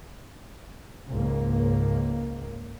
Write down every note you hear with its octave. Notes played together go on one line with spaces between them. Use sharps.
C#2 G#2 A#3